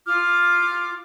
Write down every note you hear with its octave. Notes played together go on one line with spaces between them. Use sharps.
F4 D6 F6